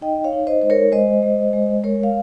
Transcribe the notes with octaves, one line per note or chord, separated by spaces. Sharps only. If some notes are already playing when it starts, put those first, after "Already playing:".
D#4 D#5 G5
C#5 F5
D#4
C5 D#5
G#3 C5
A#4 C#5
G#3 C5 D#5
G#3
G#3
G#3 A#4 C#5
F5